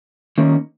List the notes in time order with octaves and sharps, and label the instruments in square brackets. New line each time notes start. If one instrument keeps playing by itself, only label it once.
[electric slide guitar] D#3 A#3 C#4